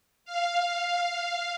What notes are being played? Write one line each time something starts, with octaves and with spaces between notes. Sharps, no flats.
F5